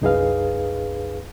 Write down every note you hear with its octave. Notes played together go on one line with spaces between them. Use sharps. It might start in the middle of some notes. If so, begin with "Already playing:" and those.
C2 F#2 D#4 G#4 B4 F5